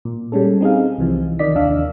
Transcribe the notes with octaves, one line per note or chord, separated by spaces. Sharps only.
A#2
G3 G#3 C#4 A4
C4 D#4 G#4 F5
C2 C3 E3 F3
D#3 D5 D#5 B6
D#2 D4 F5 E6